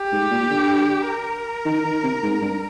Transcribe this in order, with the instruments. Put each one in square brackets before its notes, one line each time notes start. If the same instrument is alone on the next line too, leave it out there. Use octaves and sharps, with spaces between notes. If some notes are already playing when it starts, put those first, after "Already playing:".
Already playing: [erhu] G4
[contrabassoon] G#2
A#2
D3
[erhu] A#4
[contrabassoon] D#3
D#3
C3
G#2
G2